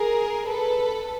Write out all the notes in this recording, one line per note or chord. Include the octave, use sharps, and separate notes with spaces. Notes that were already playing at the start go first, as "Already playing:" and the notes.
Already playing: G#4 A#4
A4 B4